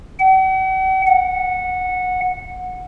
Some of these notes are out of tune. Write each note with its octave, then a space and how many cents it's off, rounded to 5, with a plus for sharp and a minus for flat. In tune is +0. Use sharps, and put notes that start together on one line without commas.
F#5 +45
F#5 -15